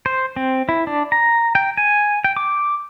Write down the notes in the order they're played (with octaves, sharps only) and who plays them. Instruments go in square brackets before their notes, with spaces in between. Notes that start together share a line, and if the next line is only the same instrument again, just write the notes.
[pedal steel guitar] C5
C4
E4
D4
A#5
G5
G#5
G5
D6